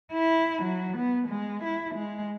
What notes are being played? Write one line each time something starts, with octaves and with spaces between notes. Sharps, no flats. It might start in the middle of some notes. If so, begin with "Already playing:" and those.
E4
F#3
B3
G#3
E4
G#3